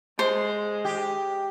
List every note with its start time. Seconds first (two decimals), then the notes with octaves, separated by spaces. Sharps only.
0.19 G#3 C5
0.85 G4